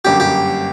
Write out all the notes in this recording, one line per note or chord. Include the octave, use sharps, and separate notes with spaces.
G1 F#2 D3 G3 A#3 G4
G4